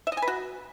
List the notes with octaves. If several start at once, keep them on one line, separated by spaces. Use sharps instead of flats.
E5
D#5
G#5
B4
F#4